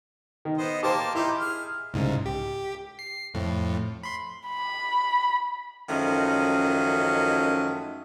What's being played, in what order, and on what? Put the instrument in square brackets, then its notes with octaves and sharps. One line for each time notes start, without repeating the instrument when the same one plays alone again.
[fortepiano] D#3
[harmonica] B3 C5 D#5
[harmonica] A#3 A5 D6 [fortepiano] G4 C5
[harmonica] D#4 G4 C6 [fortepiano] E4
[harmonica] G#4 F6
[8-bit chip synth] C2 G#2 C#3
G4
C7
F2 A2
B5 C6
[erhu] B5
[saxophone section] F#2 D#3 F3 G#3 A3 C#4